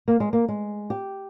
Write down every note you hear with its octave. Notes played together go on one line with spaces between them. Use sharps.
A#3
G#3
A#3
G#3
G4